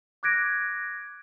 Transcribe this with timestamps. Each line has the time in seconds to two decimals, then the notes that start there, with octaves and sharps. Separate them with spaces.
0.23 D6 F#6 G#6 A#6 D7